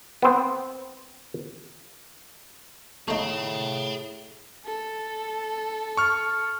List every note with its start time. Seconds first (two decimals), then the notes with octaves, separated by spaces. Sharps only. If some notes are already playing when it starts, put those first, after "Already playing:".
0.22 B3 C4
3.08 A2 A3 D#4 G#4 F5
4.66 A4
5.97 C#6 F6